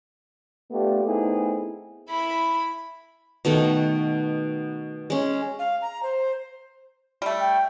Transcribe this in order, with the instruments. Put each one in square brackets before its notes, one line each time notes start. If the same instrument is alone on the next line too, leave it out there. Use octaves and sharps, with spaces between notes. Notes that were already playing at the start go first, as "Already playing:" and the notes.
[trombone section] A3 B3 D4 F4 G4
A3 B3 C4 D#4 E4 G#4
[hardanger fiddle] E4 B5
[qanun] B2 D#3 A3 F#5
G#3 C#4
[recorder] F5
A#5
C5
[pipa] G3 A3
[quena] G5